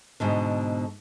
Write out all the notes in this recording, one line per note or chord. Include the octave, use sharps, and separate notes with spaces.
G#2 B2 D3